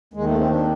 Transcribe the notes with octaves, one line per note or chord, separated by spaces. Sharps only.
D#2 D#3 G#3
A3
C4
D4